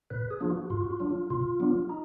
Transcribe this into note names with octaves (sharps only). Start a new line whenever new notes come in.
A#2 B4
G#4
F3 A#3 D4 F4
F#4
G#2 F4
F#4
F4
F#3 D4
F4
B2 F4
F#3 B3 D4
D#4